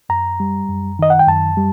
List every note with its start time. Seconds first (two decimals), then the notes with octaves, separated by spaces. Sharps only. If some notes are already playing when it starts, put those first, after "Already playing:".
0.09 F#2 A#5
0.40 G3
0.69 F#2
0.99 D#3 D#5
1.10 F#5
1.19 G5
1.28 F#2 A5
1.57 G3